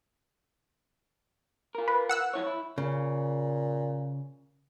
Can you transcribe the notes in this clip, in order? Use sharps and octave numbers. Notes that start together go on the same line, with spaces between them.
F4 A#4
B4
F#5 E6 F#6
F3 E4 C#5
E4
A#2 C#3